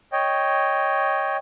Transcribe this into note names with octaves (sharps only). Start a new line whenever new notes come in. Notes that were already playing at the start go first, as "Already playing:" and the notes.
C#5 D#5 G5